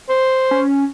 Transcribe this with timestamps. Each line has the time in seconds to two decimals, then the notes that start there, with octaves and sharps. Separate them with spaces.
0.09 C5
0.51 C#4